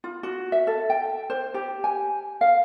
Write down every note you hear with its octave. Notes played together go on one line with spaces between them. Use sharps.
F4
F#4
E5
A4
G5
C5
G4
G#5
F5